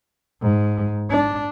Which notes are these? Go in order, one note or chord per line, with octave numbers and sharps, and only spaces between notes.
G#2
D4